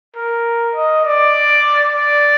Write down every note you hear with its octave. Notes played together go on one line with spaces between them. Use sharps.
A#4
D#5
D5
D5